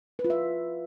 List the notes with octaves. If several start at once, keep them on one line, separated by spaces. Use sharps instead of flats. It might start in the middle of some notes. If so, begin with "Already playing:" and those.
B4
F4
E5